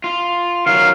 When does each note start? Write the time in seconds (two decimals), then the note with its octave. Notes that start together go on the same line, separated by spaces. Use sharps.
0.04 F4
0.66 D#3 F#3 F5